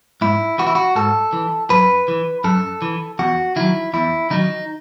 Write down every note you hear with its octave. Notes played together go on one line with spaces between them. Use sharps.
G#2 E4
E3 F#4
E4
F#4
G#2 A4
E3
F#2 B4
E3
F#2 A4
E3
E2 F#4
D#3 F#3 E4
E2 E4
D#3 F#3 D#4